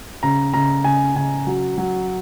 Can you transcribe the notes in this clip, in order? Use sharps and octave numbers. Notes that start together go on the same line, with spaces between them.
C#3 A#5
C#3 A#5
C#3 G#5
C#3 G#5
F#3
F#3